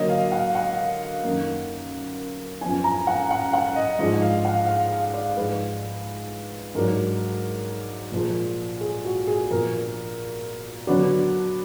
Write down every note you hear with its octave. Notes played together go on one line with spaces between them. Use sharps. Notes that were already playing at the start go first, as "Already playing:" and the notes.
Already playing: D3 F#3 A#3 D#5
F5
F#5
F#5
F#2 D#3 A#3
F#2 F3 B3 D4 G#5
A#5
F#5
F#5
F#5
D#5
G#2 F3 G#3 D4 D#5
F5
F#5
F5
F5
D5
G#2 F3 G#3 B4
G#2 F#3 D4 A#4
A#2 F3 G#3
G#4
F#4
G#4
A#2 F3 B3 D4 A#4
D3 F#3 B3 D4 F#4